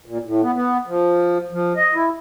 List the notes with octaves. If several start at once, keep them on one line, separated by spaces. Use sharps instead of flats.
A#2
A2
B3
B3
F3
F3
D#5
E4